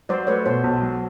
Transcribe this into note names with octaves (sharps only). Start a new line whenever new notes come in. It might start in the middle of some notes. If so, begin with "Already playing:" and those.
F#3 C5 D5
A3 B4 C#5
B2 C5
B1
F#3